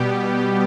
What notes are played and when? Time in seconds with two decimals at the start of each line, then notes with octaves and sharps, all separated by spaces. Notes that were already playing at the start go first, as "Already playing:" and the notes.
Already playing: B2 G3 B3 G4